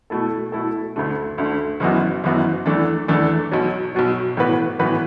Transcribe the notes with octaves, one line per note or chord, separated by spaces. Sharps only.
B2 A3 E4 A4
B2 A3 E4 A4
D2 D3 A3
D2 D3 A3
F#1 F#2 E3 B3 F#4
F#1 F#2 E3 B3 F#4
E2 E3 A3 D4 A4
E2 E3 A3 D4 A4
B1 B2 F#3
B1 B2 F#3
A2 E3 B3 F#4 B4
A2 E3 B3 F#4 B4